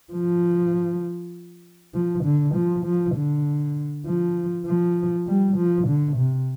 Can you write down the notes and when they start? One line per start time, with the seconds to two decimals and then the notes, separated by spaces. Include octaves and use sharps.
0.13 F3
1.94 F3
2.24 D3
2.55 F3
2.85 F3
3.15 D3
4.06 F3
4.66 F3
5.27 G3
5.57 F3
5.88 D3
6.17 C3